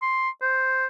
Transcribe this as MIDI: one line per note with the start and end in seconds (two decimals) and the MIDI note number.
0.02 0.29 84
0.42 0.86 72